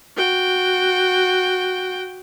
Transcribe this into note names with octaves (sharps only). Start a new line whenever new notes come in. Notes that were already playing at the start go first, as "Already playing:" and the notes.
F#4 G5